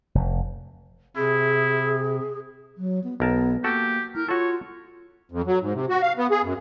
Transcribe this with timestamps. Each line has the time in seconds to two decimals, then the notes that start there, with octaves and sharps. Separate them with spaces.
0.15 F1
1.17 C3 E4 G#4
2.78 F#3
3.04 B3
3.20 B1 B3 A#4 A5
3.64 A#3 F#4 G4 A4
4.15 E4 A#4
4.28 F4 F#4 A4 C#5
5.32 F2
5.46 F#3
5.61 G#2
5.73 C3
5.89 F#4
6.02 F5
6.17 B3
6.31 G#4
6.43 F#2